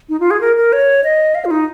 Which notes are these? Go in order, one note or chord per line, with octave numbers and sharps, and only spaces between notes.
D#4
F4
G#4
A#4
A#4
C#5
D#5
F5
F4
D#4